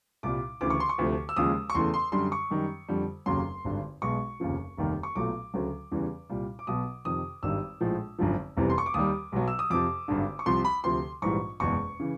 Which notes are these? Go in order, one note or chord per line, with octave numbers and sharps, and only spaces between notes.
C2 A#2 G3 D6
D2 C#3 E3 D6
C#6
C6
C#6
D2 C3 F3 A3
E6
D#2 C#3 F3 G#3 D#6
C#6
E2 C#3 E3 A3 C6
C6
F#2 D3 G3 C6
C#6
F#2 D#3 G3
F2 D3 G3
F1 D#2 C#3 F#3 C6
G#1 G2 D3
B1 B2 G#3 C#6
F1 D#2 C#3 F3
F1 D#2 D#3 G3
C#6
B1 A#2 F#3 A3 D6
D2 C#3 F#3 A3
E2 C#3 E3 G3
C2 A#2 G3
D6
B1 B2 F#3 D#6
F2 C3 D#3 D#6
G#1 G2 D#3 G3 E6
A#1 A2 F3 G#3
G#1 F#2 D3 F3
F1 E2 C3 E3 G3
C6
C#6
D6
D#2 D#3 G3 D#6
B1 B2 F#3
E6
D#6
F2 C3 F3 D6
G#1 G2 D3
C#6
C2 C3 F3 C6
B5
D2 C3 F3 C6
A#1 G#2 E3 G3 C#6
F#1 E2 B2 G#3 C#6
C#3 E3